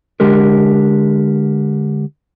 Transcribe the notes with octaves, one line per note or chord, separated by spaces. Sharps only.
D3 G#3 G4 A#4